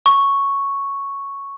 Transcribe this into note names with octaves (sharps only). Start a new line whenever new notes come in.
C#6